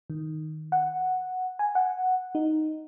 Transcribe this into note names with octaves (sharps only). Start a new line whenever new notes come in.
D#3
F#5
G#5
F#5
D#4